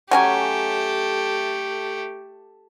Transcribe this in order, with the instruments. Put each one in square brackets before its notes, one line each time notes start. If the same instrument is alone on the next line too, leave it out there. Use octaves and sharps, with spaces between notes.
[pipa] F#3 C#4 G#5 [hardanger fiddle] A3 G4